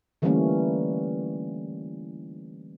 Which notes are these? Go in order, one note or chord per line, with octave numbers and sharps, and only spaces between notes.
D3 E3 G3 A3 A#3 C#4